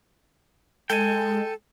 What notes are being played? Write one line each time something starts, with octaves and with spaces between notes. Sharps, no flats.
G#3 A4 G5 G#5